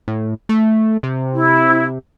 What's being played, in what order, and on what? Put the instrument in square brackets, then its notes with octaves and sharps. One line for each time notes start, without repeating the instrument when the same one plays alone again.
[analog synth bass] A2
A3
C3
[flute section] E4